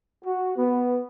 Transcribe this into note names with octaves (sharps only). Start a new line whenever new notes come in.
F#4
B3